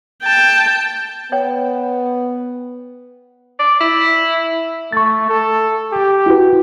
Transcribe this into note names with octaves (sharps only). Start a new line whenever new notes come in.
G5 A5
B3 C#5 G5
D5
E4
A3 C#6 A6
A4
G4
E4 F#4 B4